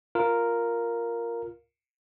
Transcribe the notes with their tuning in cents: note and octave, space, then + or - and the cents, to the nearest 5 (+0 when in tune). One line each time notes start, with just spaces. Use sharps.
F4 +0 A#4 +0